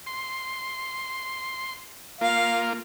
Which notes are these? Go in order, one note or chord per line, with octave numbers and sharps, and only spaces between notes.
C6
A#3 F4 F5